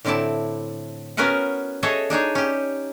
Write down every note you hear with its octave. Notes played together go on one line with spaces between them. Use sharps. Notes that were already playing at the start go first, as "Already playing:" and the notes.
A2 D3 C4 E4 D5 A5
B3 C#4 F#4 A#4 B4 F#5
F#4 G#4 A4 C#5 D#5 E5
D4 D#4 G#4 C#5
C#4 G4